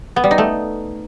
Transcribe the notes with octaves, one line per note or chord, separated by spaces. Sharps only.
B3
G3
D#4
A3